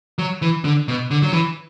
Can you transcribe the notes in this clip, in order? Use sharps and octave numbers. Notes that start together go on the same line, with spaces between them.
F#3
E3
D3
B2
D3
F#3
E3